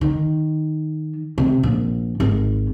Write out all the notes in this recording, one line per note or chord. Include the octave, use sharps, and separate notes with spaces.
D#3
C3
A#1
G#1